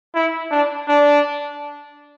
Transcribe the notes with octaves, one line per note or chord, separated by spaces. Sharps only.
E4
D4
D4